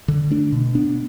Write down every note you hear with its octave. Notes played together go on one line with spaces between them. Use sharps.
D3
A3 D4
B2
B3 D4